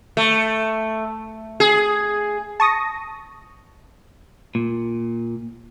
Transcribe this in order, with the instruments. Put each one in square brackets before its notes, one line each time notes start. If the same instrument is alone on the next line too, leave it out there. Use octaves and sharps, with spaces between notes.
[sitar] A3
G#4
[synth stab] A5 C#6 D#6 A#6
[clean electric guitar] A#2